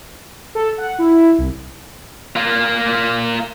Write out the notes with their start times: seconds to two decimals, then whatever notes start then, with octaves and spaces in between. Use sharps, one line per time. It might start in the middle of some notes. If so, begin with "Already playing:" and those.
0.55 A4
0.78 F#5
0.99 E4
1.38 C2
2.36 A#3 F4